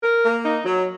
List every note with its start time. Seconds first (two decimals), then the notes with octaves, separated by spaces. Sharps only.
0.03 A#4
0.25 A#3
0.45 D#4
0.66 F#3